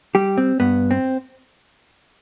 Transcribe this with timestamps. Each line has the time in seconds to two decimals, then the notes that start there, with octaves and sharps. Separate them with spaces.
0.15 G3 G4
0.38 C4
0.60 G2 B3
0.91 C4